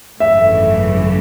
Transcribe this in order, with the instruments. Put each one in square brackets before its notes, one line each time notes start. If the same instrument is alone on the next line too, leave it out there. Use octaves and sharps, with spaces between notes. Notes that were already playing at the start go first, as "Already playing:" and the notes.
[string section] G#1 F#2 C#3 E3 A3 [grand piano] E5